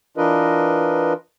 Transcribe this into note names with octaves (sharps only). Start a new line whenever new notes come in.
E3 D4 F4 A#4 B4 D#5